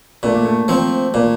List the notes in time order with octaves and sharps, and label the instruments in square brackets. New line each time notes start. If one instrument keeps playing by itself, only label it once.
[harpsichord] A#2 [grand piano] A3
[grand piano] A#3
A3
[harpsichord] F3 C4
[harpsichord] A#2 [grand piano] A#3